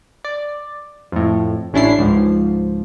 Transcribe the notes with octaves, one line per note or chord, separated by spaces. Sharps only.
D5
F2 A2
A1 C#4 D4 E4 C7
C#2 G#2 F3